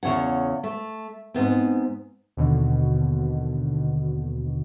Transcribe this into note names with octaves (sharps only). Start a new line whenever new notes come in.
E2 C#3 F3 C#5 F#5
A3
G#2 B3 C4
D#2 B2 D3